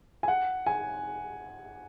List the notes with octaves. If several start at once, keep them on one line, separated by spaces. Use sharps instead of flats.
G#5
F#5
G#5